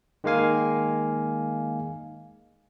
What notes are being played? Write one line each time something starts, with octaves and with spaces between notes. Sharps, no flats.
D#3 G#3 A#3 F5 G#5